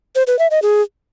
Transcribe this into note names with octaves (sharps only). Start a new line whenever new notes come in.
C5
B4
E5
D#5
G#4